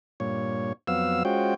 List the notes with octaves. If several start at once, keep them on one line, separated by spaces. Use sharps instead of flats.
G2 A#2 C#5
F2 F#3 B3 F5 E6
G#3 C#4 F4 F#4 C5 G5